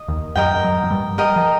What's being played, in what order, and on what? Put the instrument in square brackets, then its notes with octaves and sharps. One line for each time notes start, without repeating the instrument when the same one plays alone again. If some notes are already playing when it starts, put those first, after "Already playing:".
Already playing: [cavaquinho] D#5
[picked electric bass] D#2 D#3
[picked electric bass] F#2 F#3 [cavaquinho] A#4 D#5 G5
[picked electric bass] F#2 F#3
F#3
G2 G3
[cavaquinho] A#4 D#5 G5
[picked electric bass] F3